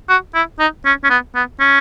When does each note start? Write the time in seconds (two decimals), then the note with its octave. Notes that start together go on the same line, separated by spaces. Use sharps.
0.09 F#4
0.34 E4
0.59 D#4
0.85 C#4
1.04 C#4
1.10 B3
1.35 B3
1.60 C#4